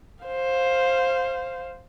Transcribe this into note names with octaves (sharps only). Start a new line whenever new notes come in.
C5 F5